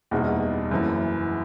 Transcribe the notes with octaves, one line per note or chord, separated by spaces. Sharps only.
F#1 E2 B2 G3 D#4
F#1 F#2 E3